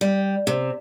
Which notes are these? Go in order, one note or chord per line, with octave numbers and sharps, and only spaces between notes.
G3
C3